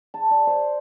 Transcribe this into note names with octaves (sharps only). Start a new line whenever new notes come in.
A5
D5
C5